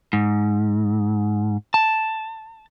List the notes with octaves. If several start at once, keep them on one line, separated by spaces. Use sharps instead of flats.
G#2
A5